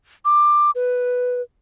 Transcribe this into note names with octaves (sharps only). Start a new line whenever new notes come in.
D6
B4